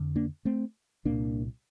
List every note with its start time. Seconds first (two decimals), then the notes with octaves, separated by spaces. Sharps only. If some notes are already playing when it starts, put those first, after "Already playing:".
Already playing: F2 D3
0.16 A#3 D4
0.45 A3 C4
1.05 C2 A#2 A#3 D4